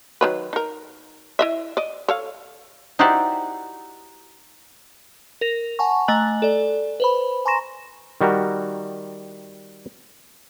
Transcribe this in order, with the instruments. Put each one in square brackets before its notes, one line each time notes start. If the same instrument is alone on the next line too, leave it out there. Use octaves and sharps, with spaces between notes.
[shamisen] D#3 F#3 B4
D#4 A#4
E4 D#5 E5
D5 D#5
A4 C#5 F5
[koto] D#4 E4 F#4 G4 C5 D5
[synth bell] A#4 A#6 F7
F#5 G#5 A5 C#6
A3 D#5 G#5 A#5 F#6 F#7
A4 D5
B4 C5 B5
G#5 A#5 C6 C#6 A#6 E7
[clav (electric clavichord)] D#3 G3 F#4 A#4